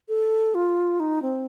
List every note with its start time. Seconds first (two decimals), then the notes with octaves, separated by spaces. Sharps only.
0.09 A4
0.55 F4
1.00 D#4
1.22 C4